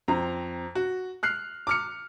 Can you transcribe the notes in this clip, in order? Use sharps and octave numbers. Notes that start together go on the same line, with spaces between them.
F2 C4 A#5
F#4
F6 F#6 C7
D6 F6 C#7